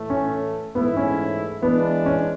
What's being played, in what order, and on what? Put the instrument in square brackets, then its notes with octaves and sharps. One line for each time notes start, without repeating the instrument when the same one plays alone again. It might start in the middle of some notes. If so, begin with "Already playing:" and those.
Already playing: [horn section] A2 E3 A3
[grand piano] C#4
[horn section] G#2 E3 A3 E4 [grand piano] B3
[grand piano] C#4
[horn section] E3 G#3 D4 [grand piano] B3
[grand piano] C#4